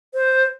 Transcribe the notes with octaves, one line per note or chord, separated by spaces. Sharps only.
C5